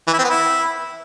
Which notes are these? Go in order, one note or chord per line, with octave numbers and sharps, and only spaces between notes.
E3
E4
C4
B3
E4